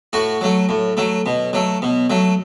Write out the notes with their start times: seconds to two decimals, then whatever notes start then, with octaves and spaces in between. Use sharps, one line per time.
0.13 A2 F#4
0.41 F#3 A3
0.69 A2
0.97 F#3 A3
1.26 B2
1.53 F#3 A3
1.82 B2
2.10 F#3 A3